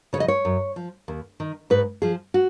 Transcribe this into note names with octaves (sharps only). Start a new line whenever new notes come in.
C#3 F3 C#5 D#5
C#5
F#2
F3
D#2
D#3
G#2 B4
F3 G#4
F#4